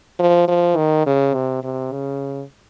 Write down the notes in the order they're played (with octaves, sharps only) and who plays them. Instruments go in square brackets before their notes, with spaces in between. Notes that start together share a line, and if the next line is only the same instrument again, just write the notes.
[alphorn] F3
F3
D#3
C#3
C3
C3
C#3